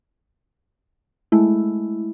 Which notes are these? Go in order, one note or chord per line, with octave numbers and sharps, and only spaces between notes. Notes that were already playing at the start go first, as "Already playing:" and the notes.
G#3 A3 E4